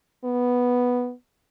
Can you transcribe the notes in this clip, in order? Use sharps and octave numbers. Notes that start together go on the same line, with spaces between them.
B3